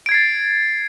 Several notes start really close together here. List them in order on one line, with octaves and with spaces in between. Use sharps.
D7 G#6 C7 A6